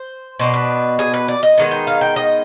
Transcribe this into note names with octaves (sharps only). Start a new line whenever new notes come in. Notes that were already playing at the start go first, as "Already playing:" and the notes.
Already playing: C5
B2 B3 D4 C5
B4
G#4
B4
D5
D#5
D#3 G#3 B3 D#4
G5
F5
G5
D#5